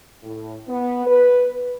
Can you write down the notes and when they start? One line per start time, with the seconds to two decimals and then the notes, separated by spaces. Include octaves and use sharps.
0.23 A2
0.68 B3
1.06 B4